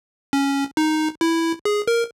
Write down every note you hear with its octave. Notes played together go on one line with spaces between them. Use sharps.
C#4
D#4
E4
G#4
A#4